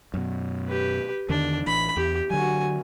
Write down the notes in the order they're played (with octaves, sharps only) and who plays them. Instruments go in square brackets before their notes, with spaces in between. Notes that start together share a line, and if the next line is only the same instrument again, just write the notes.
[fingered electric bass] F#2 B2
[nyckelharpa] G4 B4
[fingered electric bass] E2 D3 D#3 [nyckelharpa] D4
[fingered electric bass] A1 E3 D4 [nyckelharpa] B5
[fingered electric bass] E2 [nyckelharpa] G4
[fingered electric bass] D3 F#3 [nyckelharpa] F#4 G#5